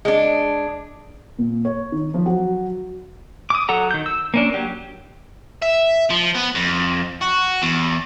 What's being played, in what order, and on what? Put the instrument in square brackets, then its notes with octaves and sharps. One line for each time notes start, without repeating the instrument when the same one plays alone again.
[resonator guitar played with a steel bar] G#3 D4
[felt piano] A#2
C#5
D#3
F3
F#3
[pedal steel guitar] D6 D#6
F#3 A4 F#5 A#5
D#3 G6
E6
A#3 C#4 D4
F#3 G4
[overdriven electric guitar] E5
F3
B3
F2
F#4
E2